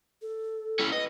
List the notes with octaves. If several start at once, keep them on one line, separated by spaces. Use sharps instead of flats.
A4
C#4 E4
B4 D#5